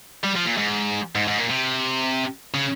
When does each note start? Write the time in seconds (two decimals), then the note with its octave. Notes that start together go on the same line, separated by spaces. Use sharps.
0.24 G3
0.36 F3
0.46 A#2
0.58 G#2
1.15 G#2
1.28 G#2
1.38 A#2
1.50 C3
2.54 C#3